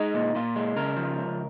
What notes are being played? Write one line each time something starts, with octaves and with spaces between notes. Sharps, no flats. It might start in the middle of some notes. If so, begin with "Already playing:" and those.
Already playing: G#3 D#4
A#2
A#2 F4
G#3
C#3 A#4
F3
C#2